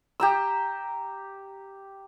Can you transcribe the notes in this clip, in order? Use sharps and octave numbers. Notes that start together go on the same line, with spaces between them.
G4 A#5 E6